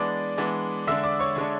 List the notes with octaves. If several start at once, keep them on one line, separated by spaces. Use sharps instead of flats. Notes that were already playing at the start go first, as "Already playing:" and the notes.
Already playing: E3 G#3 B3 D4 D5 D6
E3 G#3 B3 D4
D3 G#3 D4 E5 E6
D5 D6
C#5 C#6
D3 G#3 D4